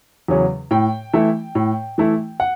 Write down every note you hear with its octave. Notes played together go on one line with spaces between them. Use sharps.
E2 C#3 F#3 C#4
A2 G5
E3 A3 E4
A2
E3 A3 E4
F#5